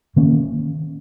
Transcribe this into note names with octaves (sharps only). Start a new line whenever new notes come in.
D#3 A#3 C#4